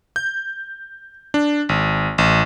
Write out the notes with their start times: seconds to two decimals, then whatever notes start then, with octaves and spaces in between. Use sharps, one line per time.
0.16 G6
1.34 D4
1.69 G#1
2.18 A1